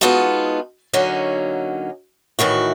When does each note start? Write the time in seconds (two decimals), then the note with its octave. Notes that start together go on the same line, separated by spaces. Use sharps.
0.01 G#3 B3 D#4 F4 F#4 A4
0.93 D3 F#3 A#3 C#4 D#4
2.39 A2 D#3 E3 F#4